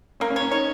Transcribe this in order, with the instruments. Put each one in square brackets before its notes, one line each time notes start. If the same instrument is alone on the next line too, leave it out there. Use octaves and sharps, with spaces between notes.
[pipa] A#3 [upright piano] C#4
[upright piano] C#4
[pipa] C#5
[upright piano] C#4
[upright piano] D#4 [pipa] C#5